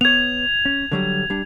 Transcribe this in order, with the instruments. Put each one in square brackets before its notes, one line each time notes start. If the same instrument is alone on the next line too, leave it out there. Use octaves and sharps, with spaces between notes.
[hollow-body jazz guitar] B3 C#5 [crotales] G#6 F7
[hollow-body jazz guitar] C#4
D3 F#3 G3
G3 D4